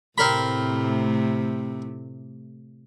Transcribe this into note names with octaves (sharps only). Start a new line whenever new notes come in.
A2 C3 A3 C4 A#4 B5